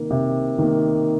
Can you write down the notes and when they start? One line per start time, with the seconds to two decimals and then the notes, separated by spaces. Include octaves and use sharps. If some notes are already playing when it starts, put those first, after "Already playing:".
Already playing: C3 D#3 A#3
0.11 C3
0.58 D#3 A#3